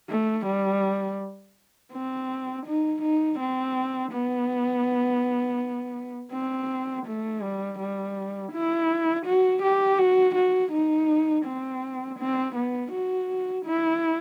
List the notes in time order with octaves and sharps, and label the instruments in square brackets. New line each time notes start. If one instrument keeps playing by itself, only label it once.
[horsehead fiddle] A3
G3
C4
D#4
D#4
C4
B3
C4
A3
G3
G3
E4
F#4
G4
F#4
F#4
D#4
C4
C4
B3
F#4
E4